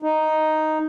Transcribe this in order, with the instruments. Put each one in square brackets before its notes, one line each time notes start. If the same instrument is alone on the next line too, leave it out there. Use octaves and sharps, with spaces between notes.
[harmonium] D#4